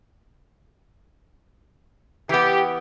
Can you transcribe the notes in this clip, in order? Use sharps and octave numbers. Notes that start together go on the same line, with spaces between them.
E3 B3 G4